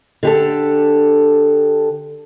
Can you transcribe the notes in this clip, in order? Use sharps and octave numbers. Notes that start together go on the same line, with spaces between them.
D3 G4 A4